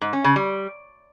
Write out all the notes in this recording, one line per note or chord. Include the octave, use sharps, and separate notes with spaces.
G#2
C#4
C#3
G3